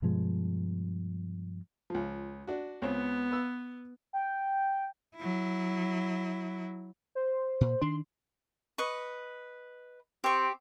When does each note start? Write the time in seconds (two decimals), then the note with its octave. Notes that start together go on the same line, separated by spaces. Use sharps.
0.02 G2 B2 F3 G#3
1.90 C#2 F3
2.47 D4 F#4
2.82 C#2 B3 C4 C#5
3.31 B4 E6
4.13 G5
5.16 F#3 E4
7.15 C5
7.61 A#2
7.82 D#3 D4 C6
8.78 B4 D#5 C#6
10.24 C4 G4 C#6